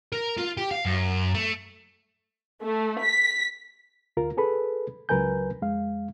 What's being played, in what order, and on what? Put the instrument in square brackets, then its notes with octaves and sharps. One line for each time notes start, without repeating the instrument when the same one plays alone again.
[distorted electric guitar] A#4
F4
G4
F5
F#2
A3
[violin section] A3
B6
[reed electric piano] D2 F4 A#4
G#4 A4 B4 B5
C#2 F#3 A#4 B4 G#5 G6
F2 G#3 F5